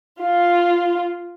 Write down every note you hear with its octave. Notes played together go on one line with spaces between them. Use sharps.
F4